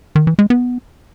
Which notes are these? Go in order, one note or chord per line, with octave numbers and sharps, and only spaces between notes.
D#3
E3
G#3
B3